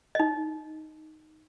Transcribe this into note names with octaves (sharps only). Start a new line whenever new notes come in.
D#4 D#5